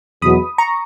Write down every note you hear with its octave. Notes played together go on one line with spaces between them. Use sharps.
E2 B2 F#3 B5 D#6
A#5 C#6